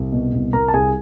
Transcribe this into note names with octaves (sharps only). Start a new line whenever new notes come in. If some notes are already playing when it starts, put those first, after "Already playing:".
Already playing: C2
B2
C2
C2 A#4 A#5
A5
C2 G#4 G#5